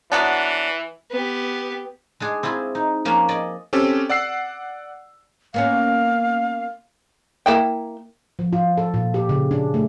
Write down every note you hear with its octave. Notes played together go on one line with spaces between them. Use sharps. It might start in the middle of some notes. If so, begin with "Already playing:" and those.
E3 F#3 B3 D4
B3 G4
G#3 D4 G#4
C4 E4 F4 G#4
D#4
F3 A#3 C#4 D4
G#4 D5 D#5
C4 C#4 G4 A4
D5 F#5 E6 C7
A#3 B3 C#4 F5
A#3 E4 G5
F3
F4
A4
A#2
G4
C#3
D4
A3